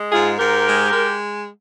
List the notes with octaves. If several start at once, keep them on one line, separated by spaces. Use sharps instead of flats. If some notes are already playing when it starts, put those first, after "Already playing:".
Already playing: G#3
G#2 F4 G#4
G#2 G4 A#4
G#3
G#3